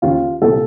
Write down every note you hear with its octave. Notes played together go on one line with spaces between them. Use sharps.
D#2 C#3 F4
C2 A#2 A4